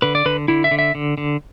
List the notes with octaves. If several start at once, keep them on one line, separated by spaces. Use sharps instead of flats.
D3 B4
D5
D3 B4
D3 E4
E5
D3
E5
D3
D3